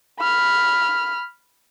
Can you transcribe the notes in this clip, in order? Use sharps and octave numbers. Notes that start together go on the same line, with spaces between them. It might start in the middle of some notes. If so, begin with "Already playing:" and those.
B5 F6